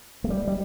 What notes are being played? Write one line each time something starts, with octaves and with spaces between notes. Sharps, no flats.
A3
G3
G3